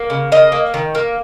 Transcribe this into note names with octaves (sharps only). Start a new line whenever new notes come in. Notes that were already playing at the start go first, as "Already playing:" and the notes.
Already playing: A#3
C#3
A#3 D#5
A#3
D#3
A#3